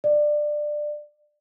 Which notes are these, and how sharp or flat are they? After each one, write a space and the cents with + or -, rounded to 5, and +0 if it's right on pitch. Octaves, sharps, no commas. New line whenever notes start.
D5 +15